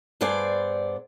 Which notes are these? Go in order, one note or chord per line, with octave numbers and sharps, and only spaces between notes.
G2 B3 G#4 C5 D5